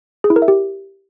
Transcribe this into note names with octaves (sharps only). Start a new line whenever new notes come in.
G#4
E4
A#4
E5
G4